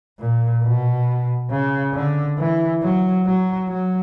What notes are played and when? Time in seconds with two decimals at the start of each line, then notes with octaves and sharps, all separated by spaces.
0.19 A#2
0.62 B2
1.50 C#3
1.93 D3
2.38 E3
2.82 F#3
3.25 F#3
3.68 F#3